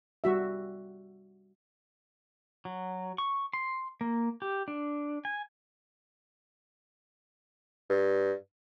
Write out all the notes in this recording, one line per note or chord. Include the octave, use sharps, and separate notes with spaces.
G3 F#4 E5
F#3
C#6
C6
A#3
G4
D4
G#5
G2